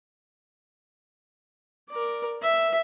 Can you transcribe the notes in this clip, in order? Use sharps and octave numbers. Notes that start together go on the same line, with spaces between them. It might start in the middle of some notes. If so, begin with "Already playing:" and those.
A#4 D5
E5